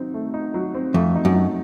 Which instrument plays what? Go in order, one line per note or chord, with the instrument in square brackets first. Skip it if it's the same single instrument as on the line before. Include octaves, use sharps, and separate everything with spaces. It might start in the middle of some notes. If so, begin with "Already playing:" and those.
Already playing: [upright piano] F#3 C4 D#4
A3
D#4
F#3
C4
[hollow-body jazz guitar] F2 [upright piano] A3
[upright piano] D#4
[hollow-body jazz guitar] F#2
[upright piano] F#3